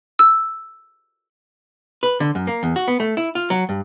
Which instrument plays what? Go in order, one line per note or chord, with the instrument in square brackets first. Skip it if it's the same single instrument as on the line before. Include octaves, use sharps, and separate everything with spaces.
[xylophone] E6
[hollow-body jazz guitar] B4
D3
F#2
A#3
E2
F#4
B3
A3
E4
F4
F#3
G2